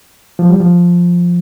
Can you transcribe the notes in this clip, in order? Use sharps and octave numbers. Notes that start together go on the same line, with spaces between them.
F3
G3
F3